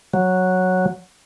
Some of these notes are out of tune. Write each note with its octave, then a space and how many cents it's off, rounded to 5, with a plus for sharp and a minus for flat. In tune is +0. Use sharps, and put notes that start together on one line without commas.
F#3 -5